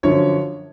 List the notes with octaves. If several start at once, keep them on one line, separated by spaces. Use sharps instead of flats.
F#2 D3 F3 C#5